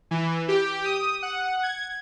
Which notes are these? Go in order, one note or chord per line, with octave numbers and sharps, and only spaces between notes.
E3
G4
D#6
F#5
G#6